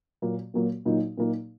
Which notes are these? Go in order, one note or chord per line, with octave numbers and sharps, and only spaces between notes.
A#2 F#3 A#3
A#2 F#3 A#3
A#2 F#3 A#3 D#4
A#2 F#3 A#3 D#4